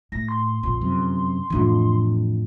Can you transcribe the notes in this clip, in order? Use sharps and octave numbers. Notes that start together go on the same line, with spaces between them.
A2 A#6
C6
A#1 F2 D3
F#2 C3
F2 A2 E3 D4